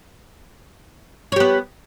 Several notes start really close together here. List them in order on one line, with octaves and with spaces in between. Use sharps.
C#5 G4 B3